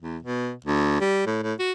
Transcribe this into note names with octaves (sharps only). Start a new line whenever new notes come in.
E2
B2
D2
G3
A2
A2
F#4